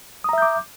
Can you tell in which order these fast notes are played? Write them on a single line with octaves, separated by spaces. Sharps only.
D#6 A#5 E5 G6 D6